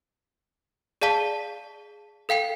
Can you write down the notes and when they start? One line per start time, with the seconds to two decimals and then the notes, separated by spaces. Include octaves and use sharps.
1.02 G#4 D5 F5 A5 B6 G7
2.29 A4 F5 G5 C7